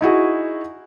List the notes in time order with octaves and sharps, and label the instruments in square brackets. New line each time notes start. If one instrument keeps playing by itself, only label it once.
[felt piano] D#4 E4 F#4 G#4